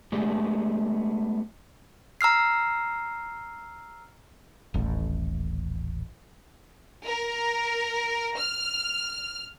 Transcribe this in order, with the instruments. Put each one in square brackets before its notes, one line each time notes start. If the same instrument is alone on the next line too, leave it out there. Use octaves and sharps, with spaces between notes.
[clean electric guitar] G#3 A3 B3 D4 G4 G#4
[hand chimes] A#5 E6 F6 C7
[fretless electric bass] D#1 A1 A2
[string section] A#4
F6